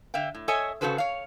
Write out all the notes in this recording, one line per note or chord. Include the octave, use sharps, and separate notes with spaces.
D3 E5 F5 G5
A2
A4 C#5 D#5 E5 G#5
C#3 G#3 F#4 A4 B4 C5
C#5 F5